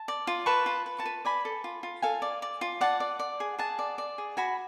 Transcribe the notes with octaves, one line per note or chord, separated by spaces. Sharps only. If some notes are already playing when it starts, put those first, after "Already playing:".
Already playing: A5
D5
F4
B4 A5 C#6
F4
B4
A5 C#6
B4
D5 G#5 B5
A4
F4
F4
A4 F5 G#5
D5
D5
F4
D5 F#5 A5
D5
D5
G#4
G#4 F#5 A5
D5
D5
G#4
F#4 G#5 B5